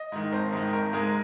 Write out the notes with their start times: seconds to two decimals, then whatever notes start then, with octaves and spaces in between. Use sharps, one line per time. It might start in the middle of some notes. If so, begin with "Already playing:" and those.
Already playing: D#5
0.12 G#2 D#3
0.32 G#1 C5
0.52 G#2 D#3
0.73 G#1 A#4
0.93 G#2 G#3 A#4